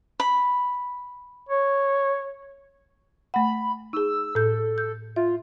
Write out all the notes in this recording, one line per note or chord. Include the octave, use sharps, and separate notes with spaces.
B5
C#5
A3 F#5 B5
D#4 G#4 E6
A2 A4 G6
G6
F4 E5